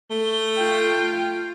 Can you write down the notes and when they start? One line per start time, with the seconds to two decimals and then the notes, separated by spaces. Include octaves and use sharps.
0.10 A3 G7
0.56 F4 G5